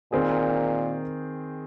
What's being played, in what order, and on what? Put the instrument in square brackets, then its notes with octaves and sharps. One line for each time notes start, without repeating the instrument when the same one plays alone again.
[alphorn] A#2 [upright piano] D#3 C4 G#4